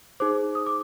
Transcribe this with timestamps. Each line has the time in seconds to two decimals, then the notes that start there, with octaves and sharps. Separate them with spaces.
0.20 D#4 G#4 C5 D6
0.55 D#6
0.66 D6